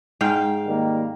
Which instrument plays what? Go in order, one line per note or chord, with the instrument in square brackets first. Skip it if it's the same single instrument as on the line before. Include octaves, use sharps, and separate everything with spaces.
[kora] G#2 F5 G5
[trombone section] D#3 G3 A#3